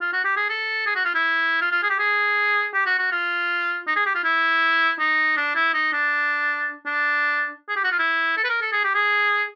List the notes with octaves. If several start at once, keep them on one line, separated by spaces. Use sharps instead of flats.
F4
F#4
G4
G#4
A4
G#4
F#4
F4
E4
F4
F4
G#4
G4
G#4
G4
F#4
F#4
F4
D#4
G#4
G4
F4
E4
D#4
D4
E4
D#4
D4
D4
G#4
G4
F#4
F4
E4
A4
B4
A#4
A4
G#4
G4
G#4